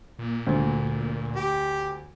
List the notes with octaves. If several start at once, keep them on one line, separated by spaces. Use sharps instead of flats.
A#2
D2
G4